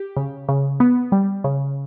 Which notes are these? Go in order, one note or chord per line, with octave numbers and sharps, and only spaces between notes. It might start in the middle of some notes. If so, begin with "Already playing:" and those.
Already playing: G4
C#3
C#3
B3
G3
C#3